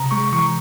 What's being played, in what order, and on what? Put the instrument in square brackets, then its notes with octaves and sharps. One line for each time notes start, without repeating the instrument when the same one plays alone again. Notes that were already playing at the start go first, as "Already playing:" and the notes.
Already playing: [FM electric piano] C3 A#5
G#3 C#6
E3 C#6